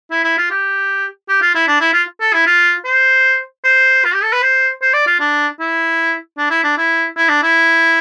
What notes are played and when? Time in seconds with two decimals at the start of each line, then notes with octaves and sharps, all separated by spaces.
0.11 E4
0.24 E4
0.38 F4
0.51 G4
1.29 G4
1.42 F4
1.55 E4
1.68 D4
1.81 E4
1.94 F4
2.21 A4
2.33 E4
2.46 F4
2.85 C5
3.64 C5
4.05 F4
4.14 G4
4.23 A4
4.33 B4
4.42 C5
4.82 C5
4.94 D5
5.07 F4
5.20 D4
5.60 E4
6.38 D4
6.50 E4
6.64 D4
6.78 E4
7.17 E4
7.29 D4
7.43 E4